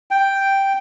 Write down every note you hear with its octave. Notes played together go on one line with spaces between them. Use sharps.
G5